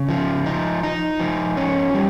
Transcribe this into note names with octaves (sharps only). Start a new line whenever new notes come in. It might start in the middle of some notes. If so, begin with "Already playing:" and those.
Already playing: C#3
F3
D#4
D#4
F3
C#4
G3